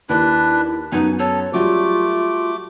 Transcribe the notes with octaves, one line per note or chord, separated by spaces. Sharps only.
D#2 D4 E4 B4
F#2 B3 D#4 G#5
A4 C#5
F#3 G3 A3 F4 D6